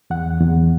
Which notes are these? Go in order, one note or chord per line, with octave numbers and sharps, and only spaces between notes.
E2 F#5
E2